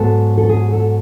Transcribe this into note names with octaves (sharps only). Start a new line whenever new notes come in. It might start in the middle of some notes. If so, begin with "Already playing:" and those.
Already playing: G#2 F#3 B3 A4
A4
G#4
A4